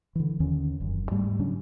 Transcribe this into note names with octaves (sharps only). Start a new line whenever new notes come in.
D3 E3
D#2 D3 D#3 C#4
F1 F#2
G#2 G3 A3
C#3 F#3 C#4 D4